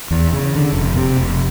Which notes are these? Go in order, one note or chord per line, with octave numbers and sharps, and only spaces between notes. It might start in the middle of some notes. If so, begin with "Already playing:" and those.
E2
C#3
D3
F1
C3
F1